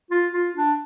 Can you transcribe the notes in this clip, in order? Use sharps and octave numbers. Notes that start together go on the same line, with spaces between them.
F4
F4
D4